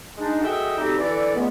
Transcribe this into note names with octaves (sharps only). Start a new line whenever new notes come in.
G#3 D4 D#4
F#4 G#4 A4 D#5 E5 G5
G3 A3 C4 D#4 F#4 G4
D3 E3 A4 D5
C#2 G#3 A3 B3